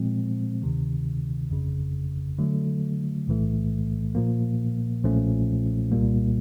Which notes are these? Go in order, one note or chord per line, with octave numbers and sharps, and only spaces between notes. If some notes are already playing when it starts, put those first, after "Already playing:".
Already playing: A#2 F3 G#3 C4
D2 C3 D#3
G1 F2 C#3
D3 F#3 A3
B1 A2 E3 A3
A#2 F3 A#3
B1 A#2 F3 A3 C#4
C2 A#2 G3 A#3